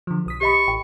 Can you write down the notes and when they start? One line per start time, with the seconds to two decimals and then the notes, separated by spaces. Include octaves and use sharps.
0.07 D3 F3
0.26 B1 D#6 B6
0.41 G4 D#5 B5 C#6
0.68 A1 G5